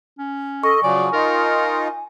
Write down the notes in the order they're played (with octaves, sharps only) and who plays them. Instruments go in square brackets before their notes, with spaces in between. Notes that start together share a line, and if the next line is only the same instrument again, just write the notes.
[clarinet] C#4
[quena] A4 [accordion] D#5 [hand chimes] C#6
[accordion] C#3 F3 F#3 [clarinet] D5 [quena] G#5
[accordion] D#4 F4 [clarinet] A#4